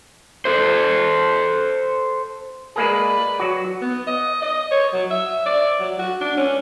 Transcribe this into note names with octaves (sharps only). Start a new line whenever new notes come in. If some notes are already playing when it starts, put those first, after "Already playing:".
A4 C5
G#3 A#3 G#4 B4 D5
F#3 F#4
B3
D#5
D#5
C#5
F#3
E5
D5
F#3
F#4
D4
C#4